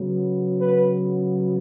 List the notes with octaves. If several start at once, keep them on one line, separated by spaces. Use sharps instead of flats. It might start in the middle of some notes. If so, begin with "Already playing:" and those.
Already playing: C#3 F#3 B3
B4